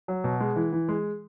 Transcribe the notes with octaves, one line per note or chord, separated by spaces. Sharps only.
F#3
B2
G#3
E3
E3
G#3